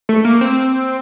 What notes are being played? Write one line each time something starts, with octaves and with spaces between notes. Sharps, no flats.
A3
A#3
C4